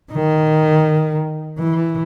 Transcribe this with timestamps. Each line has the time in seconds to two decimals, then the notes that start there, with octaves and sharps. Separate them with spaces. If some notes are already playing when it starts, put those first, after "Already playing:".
0.13 D#3
1.59 E3